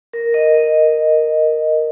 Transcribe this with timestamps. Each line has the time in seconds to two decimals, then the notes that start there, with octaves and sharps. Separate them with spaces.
0.13 A#4
0.34 D#5
0.54 D#5